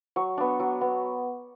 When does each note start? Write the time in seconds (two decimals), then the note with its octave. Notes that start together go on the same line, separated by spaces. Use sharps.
0.16 F#3 C#6
0.37 B3 D4
0.60 F#3
0.81 B3